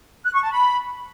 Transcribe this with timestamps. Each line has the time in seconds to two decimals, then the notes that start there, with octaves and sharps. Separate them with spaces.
0.24 F#6
0.33 C#6
0.42 A5
0.51 B5